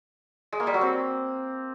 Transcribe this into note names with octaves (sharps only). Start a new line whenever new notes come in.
G#3
A#3
G3
F#3
C4